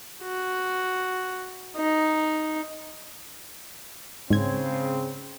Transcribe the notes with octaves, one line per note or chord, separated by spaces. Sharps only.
F#4
D#4
G#2 C#3 C4 G#6